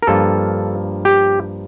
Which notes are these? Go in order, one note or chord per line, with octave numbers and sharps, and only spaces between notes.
A#4
G2 F3 A#3 F4 A4
G4